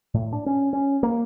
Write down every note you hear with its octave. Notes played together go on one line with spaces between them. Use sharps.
A2
D4
C#4
C#4
A#3